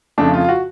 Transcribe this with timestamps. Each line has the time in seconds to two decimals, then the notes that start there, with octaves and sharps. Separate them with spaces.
0.18 F2 C#3 F3 A3 D4
0.34 F4
0.44 F4
0.49 F#4